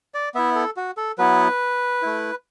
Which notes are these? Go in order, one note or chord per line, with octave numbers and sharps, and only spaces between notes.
D5
B3 E4 E5
A4
F#4
A4
F#3 B3 E4 B4
A3 E4